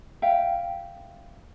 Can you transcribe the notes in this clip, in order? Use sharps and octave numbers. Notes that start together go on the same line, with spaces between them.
E5 F5 G5